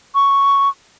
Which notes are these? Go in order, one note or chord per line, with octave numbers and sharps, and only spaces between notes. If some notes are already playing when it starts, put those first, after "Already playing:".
C#6